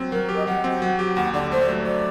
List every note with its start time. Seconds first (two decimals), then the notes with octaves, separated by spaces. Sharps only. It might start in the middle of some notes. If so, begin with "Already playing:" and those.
Already playing: F#3 C4
0.12 F#3 A#4
0.29 G4
0.36 D#5
0.47 F#3 F#5
0.64 C4
0.82 F#3
0.99 G4
1.17 D#2 F#5
1.33 D3 D5
1.52 A3 C5
1.69 F#3
1.86 D5